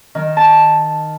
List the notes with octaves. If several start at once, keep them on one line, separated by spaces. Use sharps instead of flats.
D#3
A5